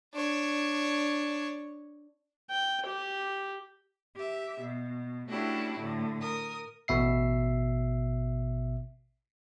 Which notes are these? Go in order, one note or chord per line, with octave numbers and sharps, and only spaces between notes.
D4 C#5
G5
G4
G4 E5
B2
A3 C#4 D4 E4 F#4 G4
A2 D3 A3
A#4 D#6
A1 B2 E5 C7